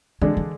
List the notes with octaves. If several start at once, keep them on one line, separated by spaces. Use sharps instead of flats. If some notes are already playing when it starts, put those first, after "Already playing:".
D3 E3 G#3 D4
E3